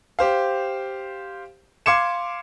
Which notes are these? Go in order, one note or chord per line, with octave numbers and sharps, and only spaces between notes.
G4 C5 F5
F5 C6 D6 G#6 C#7 E7